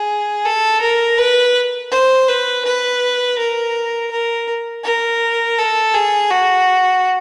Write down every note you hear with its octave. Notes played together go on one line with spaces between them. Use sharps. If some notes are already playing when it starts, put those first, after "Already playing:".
Already playing: G#4
A4
A#4
B4
C5
B4
B4
A#4
A#4
A#4
A4
G#4
F#4